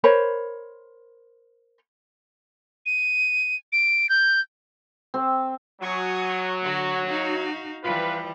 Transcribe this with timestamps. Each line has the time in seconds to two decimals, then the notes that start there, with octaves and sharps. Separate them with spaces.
0.04 A#4 C5 C#5 B5
2.86 D#7
3.72 D7
4.09 G6
5.14 C4
5.82 F#3 G#5 C#6 D#6
6.62 D3 F#4
7.06 D#4 F#4 F5
7.83 E3 F3 G3 F4 B4